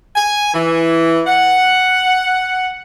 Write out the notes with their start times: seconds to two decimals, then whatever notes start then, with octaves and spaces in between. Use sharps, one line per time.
0.16 G#5
0.54 E3
1.27 F#5